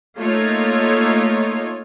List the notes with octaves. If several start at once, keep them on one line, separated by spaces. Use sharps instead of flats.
A3 A#3 D#4 F4 C#5